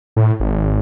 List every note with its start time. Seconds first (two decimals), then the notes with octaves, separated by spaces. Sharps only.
0.16 A2
0.40 G#1